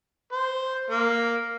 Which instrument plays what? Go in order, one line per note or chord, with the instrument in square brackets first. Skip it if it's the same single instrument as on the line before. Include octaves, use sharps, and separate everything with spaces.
[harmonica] C5
A#3